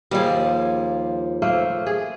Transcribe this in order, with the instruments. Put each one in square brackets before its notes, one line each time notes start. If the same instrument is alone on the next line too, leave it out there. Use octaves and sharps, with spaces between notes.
[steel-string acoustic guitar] D#2 F3 [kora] G3 G#4
[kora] A3 A#3 C5
G#4